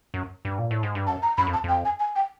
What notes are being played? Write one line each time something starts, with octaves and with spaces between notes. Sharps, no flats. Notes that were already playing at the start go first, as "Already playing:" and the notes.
F#2
G2
A#2
A2
G#2
G2
F#2 A5
A#5
F#2 B5
F2
A5
F2 G5
G#5
G#5
G5